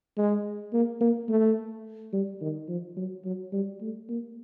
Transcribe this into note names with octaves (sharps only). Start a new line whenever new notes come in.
G#3
A#3
A#3
A3
G3
D#3
F3
F#3
F#3
G3
A3
A#3